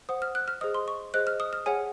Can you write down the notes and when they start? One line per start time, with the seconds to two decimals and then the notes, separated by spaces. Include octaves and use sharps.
0.09 C5 F#5 D#6
0.22 F6
0.35 F#6
0.48 F6
0.61 G#4 C5 D#5 D#6
0.74 C6
0.88 C#6
1.14 G#4 C5 D#5 F#6
1.27 F6
1.40 D#6
1.53 F6
1.66 G#4 C#5 F#5 G#5